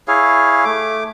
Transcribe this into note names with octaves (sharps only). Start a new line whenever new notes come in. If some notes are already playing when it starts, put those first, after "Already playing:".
E4 G#4 C#5 F5
A3 D6